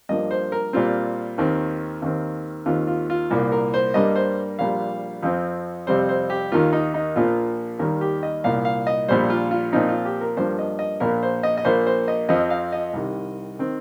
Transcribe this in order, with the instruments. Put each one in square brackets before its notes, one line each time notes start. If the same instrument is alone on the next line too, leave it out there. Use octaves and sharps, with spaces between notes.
[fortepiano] G2 F3 A#3 D#5
C5
A#4
A#2 G3 C4 F4
D#2 D#3 C4
D#2 D#3 C4
D#2 D#3 C4 F4
F4
F4
C2 A#2 A#3
A#4
C5
G2 G3 A#3 D#5
C5
A#1 A#2 G3 F5
F2 F3 C4
F2 C3 G3 C4 C5
C5
G4
D#2 D#3 A#3 F4
D#4
D#4
A#1 A#2 F3 A#3 F4
D#2 D#3 G3 A#3 A#4
G4
D#5
C2 A#2 A#3 F5
F5
D#5
A#1 A#2 G3 C5
F4
F4
A#2 F3 C4 D#4
F4
G4
A#4
G2 F3 A#3 C5
D#5
D#5
A#1 A#2 A#3 A#4
C5
D#5
D#5
A#1 A#2 A#3 C5
C5
D#5
F2 F3 C4 D#5
F5
D#5
C2 C3 D#3
D#3 C4